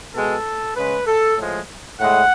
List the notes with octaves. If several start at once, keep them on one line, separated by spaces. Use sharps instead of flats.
B2 G#3 A4
C#3 G#3 B4
A4
A2 F3 G#3
A2 G#3 F#5